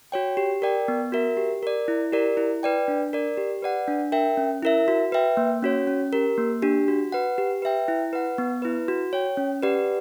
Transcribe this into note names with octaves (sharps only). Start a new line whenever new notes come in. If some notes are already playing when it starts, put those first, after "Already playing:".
F#4 C#5 G5
G4
A#4 D5 G5
B3
F#4 A#4 E5
G4
A#4 D5
E4
G4 A#4 D5
E4
B4 D5 G5
D4
A#4 D5
G4
B4 D5 F#5
D4
A#4 E5 G5
C#4
E4 A#4 E5
F#4
B4 E5 G5
A#3
C#4 F#4 C#5
C#4
G4 A#4
A#3
D4 G4
F#4
B4 F#5
G4
B4 E5 G5
E4
B4 F#5
B3
E4 B4
F#4
C#5 G5
C#4
G4 B4 D5 F#5